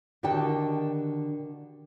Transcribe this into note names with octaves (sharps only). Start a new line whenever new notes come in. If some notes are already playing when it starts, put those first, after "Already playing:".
D3 D#3 F#4 G4 G5 A5